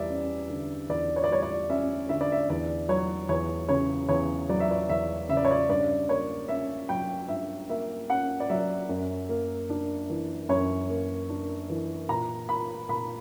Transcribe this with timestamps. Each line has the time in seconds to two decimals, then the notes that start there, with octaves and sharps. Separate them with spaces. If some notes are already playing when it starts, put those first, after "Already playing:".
Already playing: E2 G3 D5 E5
0.10 C#4
0.50 D3
0.89 E2 D5
1.16 C#5
1.24 D5
1.29 G3 C#5
1.42 D5
1.70 C#4 E5
2.09 D3 E5
2.21 D5
2.32 E5
2.50 E2 D5
2.89 F#3 C#5
3.29 E2 C#5
3.69 C#3 C#5
4.09 E2 C#5
4.49 F#3 D5
4.60 E5
4.71 D5
4.89 E2 E5
5.29 C#3 E5
5.37 D5
5.45 C#5
5.51 D5
5.69 G2 D5
6.09 A#3 C#5
6.49 C#4 E5
6.89 F#3 G5
7.28 G2 E5
7.69 A#3 E5
8.09 C#4 F#5
8.40 D5
8.49 F#3 E5
8.89 F#2
9.29 A#3
9.70 D4
10.10 E3
10.49 F#2 C#5
10.90 A#3
11.29 D4
11.70 E3
12.09 A#2 A#5
12.49 A#3 B5
12.89 A#2 B5